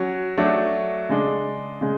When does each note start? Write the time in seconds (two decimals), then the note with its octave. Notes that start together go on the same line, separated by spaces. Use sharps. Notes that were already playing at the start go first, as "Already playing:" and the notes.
Already playing: F#3 C#4 F#4
0.37 F#3 A3 D4 F#4
1.09 C#3 G#3 D4
1.81 C#3 G#3